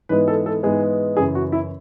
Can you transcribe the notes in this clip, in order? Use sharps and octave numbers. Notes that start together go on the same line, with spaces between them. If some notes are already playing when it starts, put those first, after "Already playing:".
G#2 E3 G#3 B3 B4
A4
A4
G#2 E3 G#3 B3 G#4
F#2 C#3 E3 G#4
F#4
E4